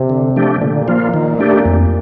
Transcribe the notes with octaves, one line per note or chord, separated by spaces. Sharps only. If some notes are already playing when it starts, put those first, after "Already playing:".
Already playing: C3
D3
F3 A3 D4 G4
A#2 D3
F3 A#3 F4
D#3
A3 D4 G4
F2